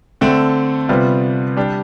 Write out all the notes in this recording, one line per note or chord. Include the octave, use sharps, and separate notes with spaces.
D3 A3 C4
C3 G3 B3 F4
G3 D4 G4